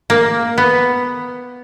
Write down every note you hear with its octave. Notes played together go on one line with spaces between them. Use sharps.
A#3
B3